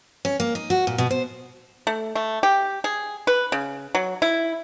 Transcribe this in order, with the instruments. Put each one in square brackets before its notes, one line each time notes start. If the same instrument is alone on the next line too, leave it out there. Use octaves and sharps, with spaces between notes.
[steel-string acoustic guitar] C#4
A#3
D#4
F#4
A#2
B2
C5
[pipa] A3
A3
G4
G#4
B4
C#3
F#3
E4